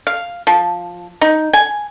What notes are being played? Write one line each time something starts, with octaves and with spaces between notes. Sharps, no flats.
F5
F3
D#4
G#5